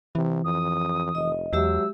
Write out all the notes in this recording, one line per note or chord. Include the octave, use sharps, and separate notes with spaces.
C3 E3
F2 D#6
F1 D#5
E2 F#3 G#3 G4 E5 E6